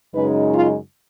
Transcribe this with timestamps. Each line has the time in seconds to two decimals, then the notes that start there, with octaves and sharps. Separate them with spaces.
0.14 F#2 C#3 G#3 D#4 B4
0.54 F4